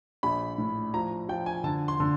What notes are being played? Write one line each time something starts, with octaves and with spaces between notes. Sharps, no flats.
A#1 B5
A2
F3 A#5
F3 G5
G#5
D3 A5
C6
D3